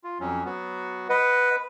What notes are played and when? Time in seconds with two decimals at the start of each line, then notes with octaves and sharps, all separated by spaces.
0.04 F4
0.20 F2 F#3 C#4
0.45 F#3 B3 F#4
1.09 B4 D#5 F#5